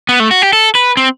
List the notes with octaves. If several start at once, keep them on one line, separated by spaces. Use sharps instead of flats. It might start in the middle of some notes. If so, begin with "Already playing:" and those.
B3
A3
F#4
G4
A4
B4
C4